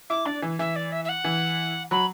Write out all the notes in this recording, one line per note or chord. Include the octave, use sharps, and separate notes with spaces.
E4 D6
D4 D5
E3
E3 E5
D5
E5
E5
F#5
E3
F#3 B5